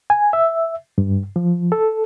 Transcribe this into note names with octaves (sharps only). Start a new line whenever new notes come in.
G#5
E5
G2
F3
A4